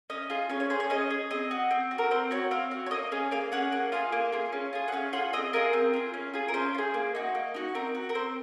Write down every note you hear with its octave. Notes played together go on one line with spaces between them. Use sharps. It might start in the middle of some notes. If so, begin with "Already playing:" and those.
C#4 D#5
F4 G#4
C#4 C#5
C#5
G#4 C5
C#5
C#4 D#5
G#4
C4 D#5
F#4
C4
F#4
A#4
C4 C5
F#4 C#5
C4 F5
F#4
C#5
A#3 D#5
C#4 G#4 F5
A#3 F5
C#4 G#4 F#5
A#3 F#5
F4 G#4 F5
A#3
F4 G#4
C#4
F4 G#4
F#5
C#4 F5
F4 G#4 F#5
C4 D#5
F4 G#4 A#4
C4
F4 G#4
C#4
F4 G#4
A#4
C#4 C5
F4
G#4
A#3
D#4 F#4
A#3
D#4 F#4
C4 A#4
F#4
A#4
C4 C5